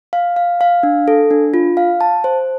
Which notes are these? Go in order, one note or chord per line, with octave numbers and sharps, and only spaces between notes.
F5
F5
F5
D4
A4
D4
F4
F5
A5
C5